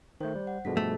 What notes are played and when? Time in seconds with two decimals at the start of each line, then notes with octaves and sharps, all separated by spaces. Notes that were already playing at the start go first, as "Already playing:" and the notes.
0.21 D#3 A3 C5 G6
0.35 G3
0.47 F#5
0.65 G2 B2 F3 G#4 A4 B6
0.77 A3